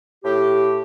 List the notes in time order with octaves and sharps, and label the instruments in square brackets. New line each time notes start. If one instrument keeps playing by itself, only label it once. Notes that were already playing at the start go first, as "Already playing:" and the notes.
[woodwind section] A2 G4